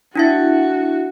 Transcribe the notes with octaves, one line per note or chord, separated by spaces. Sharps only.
D4 E4 F#4 E5